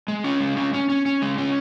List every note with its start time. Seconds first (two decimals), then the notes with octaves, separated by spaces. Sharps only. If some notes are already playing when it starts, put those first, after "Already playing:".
0.08 G#3
0.24 C#4
0.40 G#3
0.57 C#4
0.74 C#4
0.90 C#4
1.06 C#4
1.22 G#3
1.38 C#4